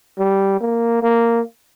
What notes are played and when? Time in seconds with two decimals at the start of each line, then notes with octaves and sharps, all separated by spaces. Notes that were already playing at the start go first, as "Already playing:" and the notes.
0.18 G3
0.61 A#3
1.03 A#3